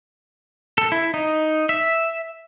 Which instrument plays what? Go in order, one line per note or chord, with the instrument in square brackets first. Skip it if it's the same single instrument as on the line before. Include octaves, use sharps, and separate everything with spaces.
[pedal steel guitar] A4
E4
D#4
E5